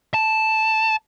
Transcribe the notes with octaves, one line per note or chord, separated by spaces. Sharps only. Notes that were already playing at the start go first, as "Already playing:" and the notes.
A5